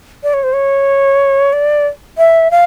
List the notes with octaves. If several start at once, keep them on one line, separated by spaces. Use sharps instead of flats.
D5
C#5
C5
C#5
D5
E5
F5